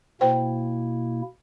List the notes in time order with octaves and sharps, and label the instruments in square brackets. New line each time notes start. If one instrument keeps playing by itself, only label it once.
[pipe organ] B2 A#3 E4 [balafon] C5 G5